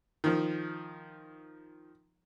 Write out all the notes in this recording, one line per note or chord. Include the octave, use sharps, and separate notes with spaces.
D#3 F3